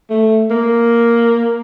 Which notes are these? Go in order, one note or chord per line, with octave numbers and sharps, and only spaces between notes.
A3
A#3